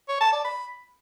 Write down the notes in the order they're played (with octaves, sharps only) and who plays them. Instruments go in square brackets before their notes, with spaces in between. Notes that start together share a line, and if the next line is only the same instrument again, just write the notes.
[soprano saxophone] C#5
A5
D5
B5